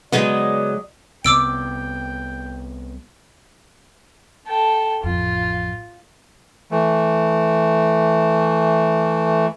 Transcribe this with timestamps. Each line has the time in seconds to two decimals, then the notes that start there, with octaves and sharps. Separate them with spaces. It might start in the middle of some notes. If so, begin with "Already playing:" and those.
0.12 C#3 F#3 G#3 B3 D5 D#5 G5
1.25 C2 B3 G5 D6 E6 D7
4.47 A4 G5
5.03 A1 F2 F4
6.71 E3 A3